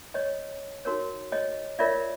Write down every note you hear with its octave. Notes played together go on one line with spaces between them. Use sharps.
C#5 D#5
D#4 F#4 A#4 C#5
C#5 D#5
F4 A#4 C#5 D5 E5